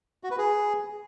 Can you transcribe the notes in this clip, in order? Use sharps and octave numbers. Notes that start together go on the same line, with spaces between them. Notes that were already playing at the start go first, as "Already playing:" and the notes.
F#4
B4
G#4